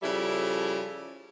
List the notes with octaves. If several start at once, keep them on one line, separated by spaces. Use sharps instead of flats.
C#3 F3 G3 E4 A4 E5